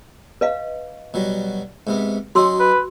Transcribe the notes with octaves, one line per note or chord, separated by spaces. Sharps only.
B4 D#5 F5
B2 F#3 G3
G#2 C3 B3
F#3 C#4 D#4 F#4 C6 E6
B4